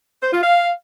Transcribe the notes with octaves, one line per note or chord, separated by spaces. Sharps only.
C5
F4
F5